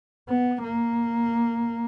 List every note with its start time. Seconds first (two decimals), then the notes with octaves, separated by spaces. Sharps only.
0.28 B3
0.64 A#3